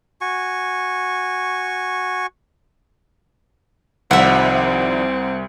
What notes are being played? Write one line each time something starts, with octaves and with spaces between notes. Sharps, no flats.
F#4 G#5 C#6
C2 D#3 F3 G3 C4 E5 F#5